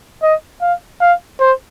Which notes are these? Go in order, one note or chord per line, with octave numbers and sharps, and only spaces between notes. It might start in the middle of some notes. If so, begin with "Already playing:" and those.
D#5
F5
F5
C5